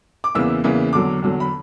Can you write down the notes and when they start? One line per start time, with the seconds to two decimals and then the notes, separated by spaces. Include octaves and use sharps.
0.24 D6
0.35 E2 C#3 E3 A#3 E6
0.64 E2 C#3 E3 A#3
0.93 E2 D3 F#3 D6
1.22 E2 D3 F#3
1.40 B5